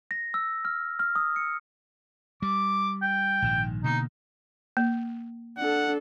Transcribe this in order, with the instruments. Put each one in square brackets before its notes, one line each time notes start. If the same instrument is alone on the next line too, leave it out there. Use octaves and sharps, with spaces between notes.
[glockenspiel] A#6
E6
F6
F6
D#6
C#7
[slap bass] G3 [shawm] D6
[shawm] G5
[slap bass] A#1 G#2 D#3
[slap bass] B2 D3 A#3 [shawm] D#4
[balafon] A#3
[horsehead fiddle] D4 A4 [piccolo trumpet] F#5